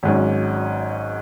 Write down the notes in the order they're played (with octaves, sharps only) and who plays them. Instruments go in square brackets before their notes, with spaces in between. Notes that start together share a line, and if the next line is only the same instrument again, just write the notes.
[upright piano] G#1 G#2 F#3 C#4